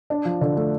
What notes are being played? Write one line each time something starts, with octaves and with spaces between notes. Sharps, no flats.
D4
F3
D3
A3